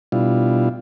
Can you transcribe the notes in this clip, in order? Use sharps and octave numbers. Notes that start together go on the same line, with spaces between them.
B2 G3 D4 E4 F4